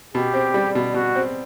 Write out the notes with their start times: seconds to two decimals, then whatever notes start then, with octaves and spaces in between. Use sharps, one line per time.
0.14 B2 G4
0.34 C4
0.54 G3
0.75 B2
0.94 B2 F#4
1.15 C4